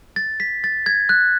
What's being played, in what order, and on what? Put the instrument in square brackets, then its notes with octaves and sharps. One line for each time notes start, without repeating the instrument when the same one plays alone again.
[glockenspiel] A6
B6
A6
G#6
F#6